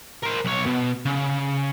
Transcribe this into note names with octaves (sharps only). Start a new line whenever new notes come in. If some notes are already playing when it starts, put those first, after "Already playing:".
A#4 C5
B1 C#5
B2
C#3